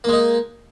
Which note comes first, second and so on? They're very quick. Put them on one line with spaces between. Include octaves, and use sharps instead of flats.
A#3 G#3 D#4